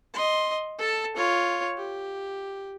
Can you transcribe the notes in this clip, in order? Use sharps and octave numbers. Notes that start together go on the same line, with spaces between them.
D#5 C6
A4 A5
F4 C#5
G4